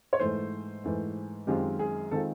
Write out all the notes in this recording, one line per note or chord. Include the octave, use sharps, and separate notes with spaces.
C#5
G#2 E3 A3 C5
G#2 E3 A3
F#2 D#3 G#3 C4 F4 G4
G#4
D#3 G#3 C4 F4 A4